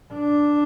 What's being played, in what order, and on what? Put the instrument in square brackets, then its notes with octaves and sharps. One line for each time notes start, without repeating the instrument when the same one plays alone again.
[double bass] D4